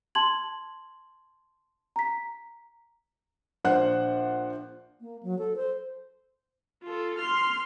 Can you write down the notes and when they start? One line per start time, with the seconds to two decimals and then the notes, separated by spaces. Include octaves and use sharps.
0.15 A5 C6 G#6 F#7
1.96 A#5 B6
3.64 A#1 D4 C5 F#5 F#6
5.01 A#3
5.23 F#3
5.39 A4
5.56 C5
6.83 F4 A4
7.18 C6 F6